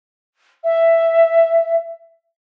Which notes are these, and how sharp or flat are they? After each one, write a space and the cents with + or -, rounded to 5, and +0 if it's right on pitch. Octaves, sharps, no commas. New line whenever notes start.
E5 +5